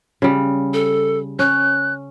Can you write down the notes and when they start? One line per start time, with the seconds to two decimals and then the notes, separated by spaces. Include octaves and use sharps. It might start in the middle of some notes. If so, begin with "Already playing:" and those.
0.22 C#3 G3
0.73 A4
1.39 C#4 F#6